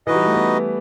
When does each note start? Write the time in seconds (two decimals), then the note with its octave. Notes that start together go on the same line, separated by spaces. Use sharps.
0.07 E3 D#4 F#4 B4 D#5
0.16 G3
0.25 A3
0.34 B3